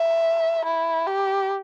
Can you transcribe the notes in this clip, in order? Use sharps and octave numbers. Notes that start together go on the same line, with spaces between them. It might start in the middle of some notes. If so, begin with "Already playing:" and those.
Already playing: E5
E4
G4